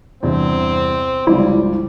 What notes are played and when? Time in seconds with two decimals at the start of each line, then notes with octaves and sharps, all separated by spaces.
0.23 E2 G2 C3 C4
1.27 G1 C#2 F3 G3 E4